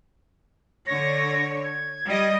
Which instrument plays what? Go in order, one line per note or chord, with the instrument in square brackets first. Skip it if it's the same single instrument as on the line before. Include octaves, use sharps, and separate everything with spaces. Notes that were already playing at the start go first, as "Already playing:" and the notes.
[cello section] D3 C#5 [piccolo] A#6
[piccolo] G#6
[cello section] G3 D#5